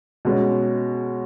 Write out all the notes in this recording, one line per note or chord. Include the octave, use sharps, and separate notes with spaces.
B2 G#3 C#4